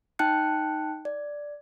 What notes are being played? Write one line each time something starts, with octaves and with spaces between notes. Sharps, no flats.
D#4 G5 A5 F#6 C#7
D5